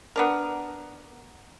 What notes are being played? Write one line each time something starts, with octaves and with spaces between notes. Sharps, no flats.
B3 D4 A#4